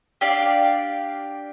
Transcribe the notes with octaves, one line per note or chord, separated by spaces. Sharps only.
D4 G4 D5 F5